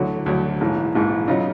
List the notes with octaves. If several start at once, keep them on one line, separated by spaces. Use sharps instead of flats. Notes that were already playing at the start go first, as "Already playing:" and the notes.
Already playing: D2 D3 F#3 E4 F#4
D2 D3 F#3
A#1 G#2 E3
A#1 G#2 E3
C#3 F#3 D#4 F4